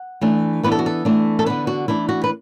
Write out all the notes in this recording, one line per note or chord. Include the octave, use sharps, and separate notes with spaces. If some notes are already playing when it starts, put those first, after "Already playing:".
Already playing: F#5
E3 A3 D4
E3 B3 D4 B4
A4
F#4
A4
E3 A3 D4
A4
D3 B3 D4 B4
F#4
E3 A3 D4 E4
F#4
B4